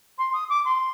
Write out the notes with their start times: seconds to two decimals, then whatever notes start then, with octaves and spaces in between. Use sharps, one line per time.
0.18 C6
0.33 D#6
0.49 D6
0.65 C6